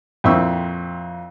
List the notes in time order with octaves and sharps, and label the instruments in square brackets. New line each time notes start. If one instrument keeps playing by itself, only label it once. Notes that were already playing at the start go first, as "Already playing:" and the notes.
[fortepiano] F2 A#2 C4 E4 C#6 E6